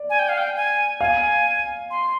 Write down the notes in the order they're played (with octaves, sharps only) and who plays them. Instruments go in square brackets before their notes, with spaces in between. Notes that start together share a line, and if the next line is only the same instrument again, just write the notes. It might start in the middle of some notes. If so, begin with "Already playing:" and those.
Already playing: [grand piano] D5
[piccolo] G#5
G5
F5
G5
G#5
[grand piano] F5 [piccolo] G#5
[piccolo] C6